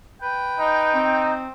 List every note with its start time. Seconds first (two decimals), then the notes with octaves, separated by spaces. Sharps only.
0.22 B4 G5
0.59 D#4
0.94 C4